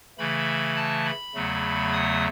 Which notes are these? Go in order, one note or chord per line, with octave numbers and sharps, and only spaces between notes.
C#3 E3 A3 B5
A5
B5
E2 C#3 F#3 A3
D#6